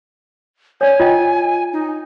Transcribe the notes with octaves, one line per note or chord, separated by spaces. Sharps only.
C#5 D5 G#5
F4 D#5 G5
D#4